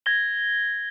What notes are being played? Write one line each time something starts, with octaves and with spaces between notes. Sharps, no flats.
G#6 A#6 G7